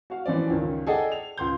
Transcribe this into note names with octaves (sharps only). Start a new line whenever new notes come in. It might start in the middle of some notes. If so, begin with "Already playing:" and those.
F#4 F5
E3 F3 C#4 D5
C#2 F#2 D#3 C#4
G#4 A4 D5 D#5 F#5 G5
F7
C#2 C6 G6